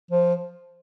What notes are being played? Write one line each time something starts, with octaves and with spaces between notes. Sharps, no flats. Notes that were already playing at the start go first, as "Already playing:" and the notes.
F3